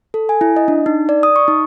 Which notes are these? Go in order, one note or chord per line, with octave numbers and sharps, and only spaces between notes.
A4
G#5
E4
D#5
D4
D#4
D5
D#6
C#6
D#4